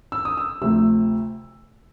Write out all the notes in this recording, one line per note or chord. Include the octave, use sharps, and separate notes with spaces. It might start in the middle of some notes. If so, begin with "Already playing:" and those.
E6
D#6
E6
D2 C3 F3 A3 E6